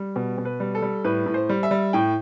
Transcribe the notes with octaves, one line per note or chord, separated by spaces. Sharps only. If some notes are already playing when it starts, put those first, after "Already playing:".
Already playing: G3
B2
B2
B4
G3
A4
G3
A2 B4
A2
C5
G3
E5
G3
A2 G5